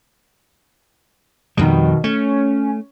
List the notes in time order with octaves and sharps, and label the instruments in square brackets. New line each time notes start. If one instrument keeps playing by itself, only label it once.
[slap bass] F2 G3 [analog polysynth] B2 D#3
[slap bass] A3 [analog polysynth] C#4